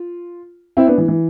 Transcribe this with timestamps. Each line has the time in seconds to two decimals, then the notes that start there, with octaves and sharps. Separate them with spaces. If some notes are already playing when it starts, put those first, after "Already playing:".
Already playing: F4
0.77 C4 E4
0.87 B3 D4
0.98 E3
1.08 E3